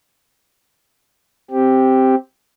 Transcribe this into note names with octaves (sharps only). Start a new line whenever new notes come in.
C4 G4